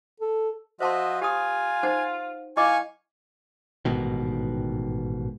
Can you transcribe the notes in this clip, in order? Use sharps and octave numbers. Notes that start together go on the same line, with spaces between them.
A4
F3 F#4 C5 D#5 E5 A5 C6
F4 G4 G#5 D#6
D#4 C5 F#5
E4 D#5 F5 G#5 C#6 D6
A1 G#2 B2 D#3